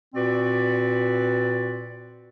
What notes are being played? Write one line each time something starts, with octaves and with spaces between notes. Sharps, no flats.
A#2 C4 F#4 B4 D5